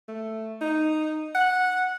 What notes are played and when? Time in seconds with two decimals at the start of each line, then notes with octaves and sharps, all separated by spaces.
0.08 A3
0.61 D#4
1.35 F#5